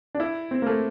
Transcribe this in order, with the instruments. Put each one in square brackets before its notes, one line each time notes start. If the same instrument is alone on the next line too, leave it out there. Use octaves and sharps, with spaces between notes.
[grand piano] D4
E4
C4
A#3
A3